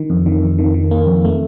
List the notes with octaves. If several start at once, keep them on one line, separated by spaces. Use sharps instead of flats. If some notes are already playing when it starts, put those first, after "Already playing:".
Already playing: D#3
F2
D#3
F2
D#3
D#3
A#3
F2
A3